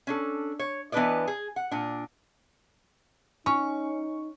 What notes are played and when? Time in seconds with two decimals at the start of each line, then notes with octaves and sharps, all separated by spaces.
0.07 C#4 D4 A4
0.59 C#5
0.92 E3 B3 D4 B4 D5 D#5
1.27 G#4
1.56 F#5
1.71 A#2 D4
3.46 C#4 D#4 C#6